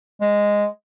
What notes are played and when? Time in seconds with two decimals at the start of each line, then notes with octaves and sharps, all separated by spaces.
0.21 G#3